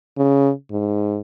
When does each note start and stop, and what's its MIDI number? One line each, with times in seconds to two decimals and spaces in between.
0.17 0.50 49
0.71 1.19 44